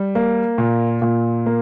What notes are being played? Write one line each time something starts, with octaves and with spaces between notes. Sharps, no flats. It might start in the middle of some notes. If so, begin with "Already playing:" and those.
Already playing: G3
A#3
A#2
A#2
A#3